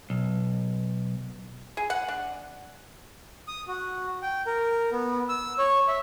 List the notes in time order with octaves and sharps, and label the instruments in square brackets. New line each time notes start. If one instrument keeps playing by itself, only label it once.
[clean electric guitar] B1
[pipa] G#4
F#5
D4
[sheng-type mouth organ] D#6
F#4
G5
A#4
B3
E6
C#5
E5